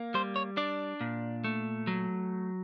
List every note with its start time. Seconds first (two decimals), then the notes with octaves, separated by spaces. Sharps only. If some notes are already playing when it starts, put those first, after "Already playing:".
Already playing: A#3
0.14 G3 C5
0.36 C#5
0.57 D4 D5
1.01 A#2
1.44 A3
1.87 F#3